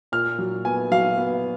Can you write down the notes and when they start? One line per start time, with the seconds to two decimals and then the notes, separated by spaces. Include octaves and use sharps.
0.12 A#2 F6
0.38 F#3
0.65 B3 G#5
0.91 F#3 F5
1.18 B3